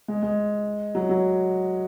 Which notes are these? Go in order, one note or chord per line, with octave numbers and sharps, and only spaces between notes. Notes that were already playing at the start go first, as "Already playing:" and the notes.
G#3
G#3
F#3
F#3